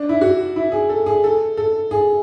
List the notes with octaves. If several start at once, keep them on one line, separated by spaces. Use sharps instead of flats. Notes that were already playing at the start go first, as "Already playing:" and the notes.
Already playing: D4
E4
F#4
E4
G#4
A4
G#4
A4
A4
G#4